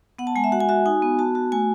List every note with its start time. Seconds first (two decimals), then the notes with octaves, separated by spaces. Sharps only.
0.19 B3 F#5
0.27 A5
0.36 G#3 G#5
0.44 E5
0.52 F#4 F#5
0.60 G#5
0.69 F#4 E5
0.86 D#4 G#5
1.02 B3
1.19 F#4 A5
1.35 F#4
1.52 A3 G#5